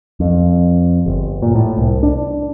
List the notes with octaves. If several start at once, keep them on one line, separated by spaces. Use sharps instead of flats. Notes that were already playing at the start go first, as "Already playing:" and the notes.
F2
G1
A#2
A2
C2
D4